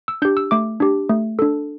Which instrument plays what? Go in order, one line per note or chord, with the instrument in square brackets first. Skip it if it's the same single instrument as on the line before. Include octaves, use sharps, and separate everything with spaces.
[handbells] E6
D4 G4 G6
E6
A3 D6
D4 G4
A3
D4 A4